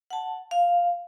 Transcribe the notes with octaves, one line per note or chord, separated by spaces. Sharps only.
F#5 A5
F5